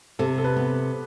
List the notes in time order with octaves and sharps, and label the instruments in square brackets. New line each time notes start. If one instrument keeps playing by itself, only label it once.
[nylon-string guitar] C3 [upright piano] A4
[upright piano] A4
B4
[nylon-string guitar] B3